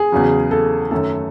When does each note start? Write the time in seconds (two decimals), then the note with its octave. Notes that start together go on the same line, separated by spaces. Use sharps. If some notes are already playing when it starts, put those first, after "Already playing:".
Already playing: G#4
0.12 E2 C#3 F#3
0.51 A4
0.91 F#2 D#3 A3 A4